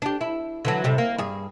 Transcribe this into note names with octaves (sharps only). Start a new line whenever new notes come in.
D4 G4
E4
D3 E3 F#3
A2 C3 G3
A#3
G2 G#4